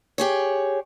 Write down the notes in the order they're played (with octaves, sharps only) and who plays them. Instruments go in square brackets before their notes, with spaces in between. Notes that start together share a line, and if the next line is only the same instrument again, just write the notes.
[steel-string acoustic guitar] G4 G#4 C#5